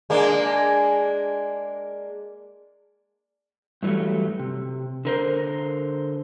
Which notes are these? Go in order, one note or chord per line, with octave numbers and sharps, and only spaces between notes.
G#3 A#3 D4
G2 E3 F#3 G3 A3
C3
D3 A#4 C5